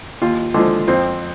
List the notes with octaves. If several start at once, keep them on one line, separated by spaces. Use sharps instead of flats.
D#2 F4
D3 F3 G#3
F2 C4